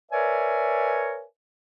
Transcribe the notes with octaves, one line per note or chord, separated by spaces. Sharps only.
A#4 B4 C#5 D5 E5 G#5